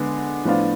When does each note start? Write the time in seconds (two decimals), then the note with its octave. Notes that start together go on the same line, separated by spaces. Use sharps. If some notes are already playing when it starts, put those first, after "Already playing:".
Already playing: D3 G#3 B3
0.44 A2 F3 B3 D4 F4